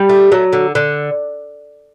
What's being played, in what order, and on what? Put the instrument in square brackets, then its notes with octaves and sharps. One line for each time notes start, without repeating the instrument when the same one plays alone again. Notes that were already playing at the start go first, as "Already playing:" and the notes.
Already playing: [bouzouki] G3
A3
F#3
D3
D3